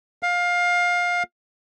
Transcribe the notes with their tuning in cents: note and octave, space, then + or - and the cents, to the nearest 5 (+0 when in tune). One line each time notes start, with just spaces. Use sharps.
F5 +20